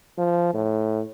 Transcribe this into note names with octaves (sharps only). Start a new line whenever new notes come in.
F3
A2